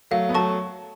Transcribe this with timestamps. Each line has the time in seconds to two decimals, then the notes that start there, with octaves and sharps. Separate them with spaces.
0.11 F#3 A3 F5
0.29 B3
0.34 F#3 A3 A5 C#6